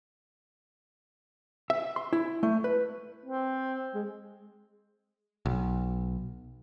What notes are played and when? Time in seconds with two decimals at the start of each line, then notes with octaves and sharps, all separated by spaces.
1.70 E5
1.96 C6
2.13 E4
2.43 A3
2.64 B4
3.26 C4
3.95 G#3
5.46 B1